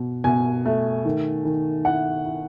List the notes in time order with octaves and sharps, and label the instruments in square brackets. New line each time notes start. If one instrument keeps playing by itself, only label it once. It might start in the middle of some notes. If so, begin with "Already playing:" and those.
Already playing: [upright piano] B2
B2 G#5
A3
D#3
D#3
E4 F#5
E4